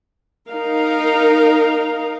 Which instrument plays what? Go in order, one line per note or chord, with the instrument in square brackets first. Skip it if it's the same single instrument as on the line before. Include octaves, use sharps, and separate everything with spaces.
[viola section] D#4 A#4 F5